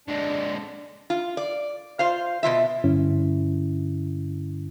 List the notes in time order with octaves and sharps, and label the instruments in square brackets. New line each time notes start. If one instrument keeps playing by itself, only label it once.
[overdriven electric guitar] D3 G#3 [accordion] D4
[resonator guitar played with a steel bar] F4
D5
F4 C5 F5
B2 E3 F4 E5
[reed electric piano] G2 D3 C#4 E4